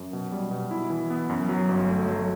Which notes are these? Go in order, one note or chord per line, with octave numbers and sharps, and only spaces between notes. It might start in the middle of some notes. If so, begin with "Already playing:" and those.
Already playing: F#2
B2
G3
B2
E4
E3
B3
F#2
F#3
G1
A3
F#3